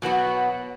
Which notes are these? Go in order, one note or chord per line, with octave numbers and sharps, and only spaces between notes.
B2 F#3 B3 F#4